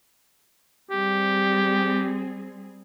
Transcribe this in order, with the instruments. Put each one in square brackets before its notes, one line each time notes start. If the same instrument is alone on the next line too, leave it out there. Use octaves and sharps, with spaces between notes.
[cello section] G3 C4 G#4 [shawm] G4